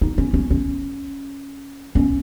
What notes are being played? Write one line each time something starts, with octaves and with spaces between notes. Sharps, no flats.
D#4
C#4
C#4
C#4
C#4